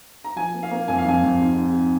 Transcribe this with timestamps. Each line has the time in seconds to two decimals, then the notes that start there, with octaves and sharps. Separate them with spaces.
0.24 A#5
0.36 F3 G#5
0.54 A#3
0.63 F5
0.71 A#3
0.88 F2 G#5
0.98 F5
1.06 F2 G#5
1.23 F2
1.41 G#2
1.58 G#2